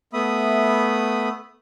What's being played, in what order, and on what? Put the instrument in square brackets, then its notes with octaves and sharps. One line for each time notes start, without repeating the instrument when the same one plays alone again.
[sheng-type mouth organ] A3 B3 E5 B5 D#6